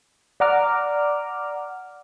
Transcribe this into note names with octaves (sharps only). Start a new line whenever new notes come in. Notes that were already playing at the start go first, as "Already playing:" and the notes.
D5 F#5 A#5 D6 F6